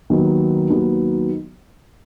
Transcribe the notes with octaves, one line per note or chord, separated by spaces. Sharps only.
D#2 D#3 F#3 B3 D#4
D#2 D#3 F#3 B3 D#4